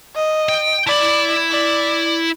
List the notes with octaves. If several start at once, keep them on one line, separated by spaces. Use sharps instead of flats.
D#5
G5
E4 D5 B5
D5